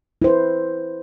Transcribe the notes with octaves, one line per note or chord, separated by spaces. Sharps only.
E4 B4 C5